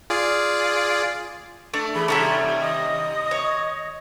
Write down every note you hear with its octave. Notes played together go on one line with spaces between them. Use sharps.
F4 G#4 D5
A3 D4
E3 G#4 B5
D#2 C3 G3 C#4 D4 E4 A4 A#5
D#5 D#6
C#5